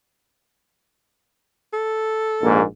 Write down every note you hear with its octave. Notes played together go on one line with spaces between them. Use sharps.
A4
A#1 G#2 A#3